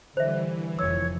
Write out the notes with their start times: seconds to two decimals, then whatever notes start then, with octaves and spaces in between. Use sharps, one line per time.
0.17 D3 E3 G3 C5 E5
0.79 F1 F2 G#2 C#5 E6